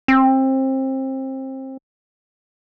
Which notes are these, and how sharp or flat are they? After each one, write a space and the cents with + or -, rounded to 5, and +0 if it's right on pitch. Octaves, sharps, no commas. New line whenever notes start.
C4 +25